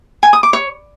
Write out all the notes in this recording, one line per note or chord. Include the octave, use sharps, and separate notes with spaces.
G#5
D#6
D6
C#5